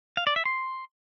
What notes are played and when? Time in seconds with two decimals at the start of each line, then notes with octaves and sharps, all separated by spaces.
0.17 F5
0.27 D5
0.36 E5
0.45 C6